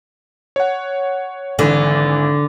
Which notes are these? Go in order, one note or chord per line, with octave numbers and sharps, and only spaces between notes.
C#5 F#5
G#1 D3 E3